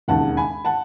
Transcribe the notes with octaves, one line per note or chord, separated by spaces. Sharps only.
E1 D#2 C#3 F#5 A5
G#5 B5
F#5 A5